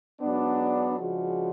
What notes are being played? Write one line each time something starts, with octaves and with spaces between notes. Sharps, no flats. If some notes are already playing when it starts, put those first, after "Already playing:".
G#2 F#3 B3 D4
C#3 F3 G#3 D4 F#4